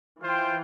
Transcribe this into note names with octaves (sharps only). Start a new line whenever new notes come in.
E3 F4 C5 G5